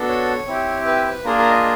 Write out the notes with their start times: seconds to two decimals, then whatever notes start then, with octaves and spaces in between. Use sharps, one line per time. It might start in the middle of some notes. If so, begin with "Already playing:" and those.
Already playing: B3 D4 F#4 A4
0.08 C#5
0.47 C4 E4 G4
0.86 B4
1.05 B4
1.24 A#3 D4 F4 G#4 A#4
1.38 A#4
1.51 D#5